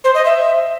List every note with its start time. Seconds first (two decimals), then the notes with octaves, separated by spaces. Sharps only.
0.04 C5
0.14 D#5
0.25 E5